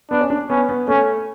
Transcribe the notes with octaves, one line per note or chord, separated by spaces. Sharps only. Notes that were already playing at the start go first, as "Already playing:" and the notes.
B3 D4
C#4
D4
B3 C#4
B3
A3 C#4